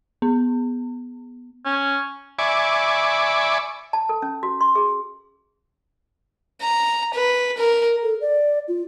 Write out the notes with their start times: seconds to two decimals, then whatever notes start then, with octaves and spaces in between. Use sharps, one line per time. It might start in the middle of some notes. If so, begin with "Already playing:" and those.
0.22 B3
1.65 C#4
2.39 D5 E5 G#5 B5 C#6 D6
3.93 A5
4.09 A4
4.22 C#4
4.43 F#4
4.61 C6
4.75 G#4
6.61 A#5
7.14 B4
7.58 A#4
8.03 A4
8.21 D5
8.68 F4